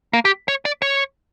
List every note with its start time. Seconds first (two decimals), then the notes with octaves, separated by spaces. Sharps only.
0.13 A#3
0.25 G4
0.48 C#5
0.65 D5
0.82 C#5